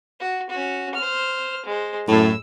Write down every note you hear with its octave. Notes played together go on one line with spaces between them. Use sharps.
F#4
C#4 F#4
C5 F6
G#3 C5
F#2 A2 E6